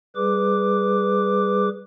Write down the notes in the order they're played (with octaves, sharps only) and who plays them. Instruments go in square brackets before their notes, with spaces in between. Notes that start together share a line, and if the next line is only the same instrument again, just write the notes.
[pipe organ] G3 G#4 B4 D6